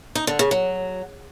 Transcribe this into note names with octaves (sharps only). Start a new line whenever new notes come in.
D#4
D3
C#3
F#3